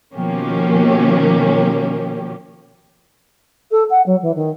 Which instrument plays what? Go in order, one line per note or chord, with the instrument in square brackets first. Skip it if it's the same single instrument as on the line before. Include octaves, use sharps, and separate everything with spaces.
[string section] B2 D#3 F3 A#3 C#4 G4
[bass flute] A4
F#5
F#3
E3
D#3